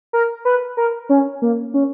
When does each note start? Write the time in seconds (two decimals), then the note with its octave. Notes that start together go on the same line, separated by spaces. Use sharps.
0.13 A#4
0.45 B4
0.77 A#4
1.09 C#4
1.42 A#3
1.74 C#4